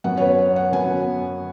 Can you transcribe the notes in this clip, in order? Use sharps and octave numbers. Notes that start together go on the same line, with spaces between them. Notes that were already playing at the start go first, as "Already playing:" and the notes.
F#2 F#3 B3 F#5
C#5
B4
C#5
F#5
F#2 F#3 B3 G#5